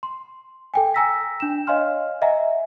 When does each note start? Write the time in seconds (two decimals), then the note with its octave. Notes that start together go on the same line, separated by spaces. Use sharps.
0.03 C6
0.74 A4 G5 G#5
0.94 G5 G#5 A#5 E6 A#6 B6
1.40 D4 E7
1.67 C#5 D#5 F5 G#5 C6 F6
2.22 D#5 E5 F#5 G#5 A#5